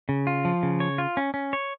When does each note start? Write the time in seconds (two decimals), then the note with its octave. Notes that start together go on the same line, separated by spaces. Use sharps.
0.09 C#3
0.27 F4
0.45 F3
0.63 C#3
0.80 C#5
0.98 F4
1.17 C#4
1.34 C#4
1.53 C#5